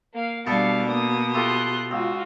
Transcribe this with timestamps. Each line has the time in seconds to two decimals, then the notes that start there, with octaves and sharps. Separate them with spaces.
0.14 A#3 F5
0.47 B2 G3 A3 B3 D4 A4 F5 C#7
0.90 A#3 D#6
1.34 F3 A3 G4 C6 F#6
1.91 C#2 F4 F#4